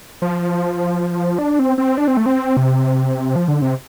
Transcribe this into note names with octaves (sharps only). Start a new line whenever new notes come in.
F3
D4
C4
C4
D4
C4
A3
C4
C3
F3
D3
C3